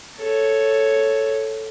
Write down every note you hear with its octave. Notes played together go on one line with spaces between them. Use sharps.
A4 C#5